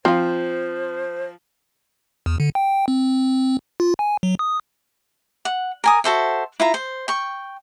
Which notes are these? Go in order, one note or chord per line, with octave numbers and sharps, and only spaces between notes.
F3 C4 F4 C5
E2
D3
G5
C4
F4
G#5
F#3
D#6
F#5
A#4 G#5 D#6
F#4 A4 C5 E5
E4 F4 A#5
C5
G5 C#6